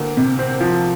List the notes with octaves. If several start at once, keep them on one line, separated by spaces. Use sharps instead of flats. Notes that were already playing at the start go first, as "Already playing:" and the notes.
Already playing: D2 A#3
C3
C4
F3